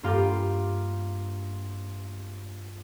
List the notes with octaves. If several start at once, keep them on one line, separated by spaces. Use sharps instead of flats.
G2 A#3 F4 G4